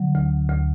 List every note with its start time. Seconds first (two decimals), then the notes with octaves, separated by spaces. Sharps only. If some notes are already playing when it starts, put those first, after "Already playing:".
Already playing: D3 F#3
0.15 D2
0.49 D2